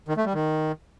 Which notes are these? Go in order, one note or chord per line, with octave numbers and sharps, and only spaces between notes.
D#3
A3
G3
D#3